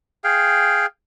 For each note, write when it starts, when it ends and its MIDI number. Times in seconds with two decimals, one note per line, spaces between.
0.24 0.86 68
0.24 0.86 77
0.24 0.86 79